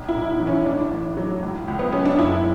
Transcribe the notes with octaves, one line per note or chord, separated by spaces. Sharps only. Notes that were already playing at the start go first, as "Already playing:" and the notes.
Already playing: B1
E4
B1
E3
C#4
A1 D4
A1
F#3
C#2
C#2
B3
F#3 C#4
D4
F#1 E4